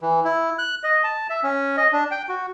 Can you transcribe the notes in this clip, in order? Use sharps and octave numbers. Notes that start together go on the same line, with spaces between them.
E3
E4
F#6
D#5
A5
E5
C#4
D#5
D4
G5
F#4